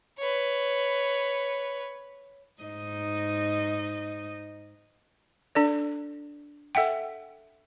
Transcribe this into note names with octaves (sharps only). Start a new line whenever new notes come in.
B4 C#5
G#2 D#4 D#5
D4 A4 D5
A4 E5 F#5 G5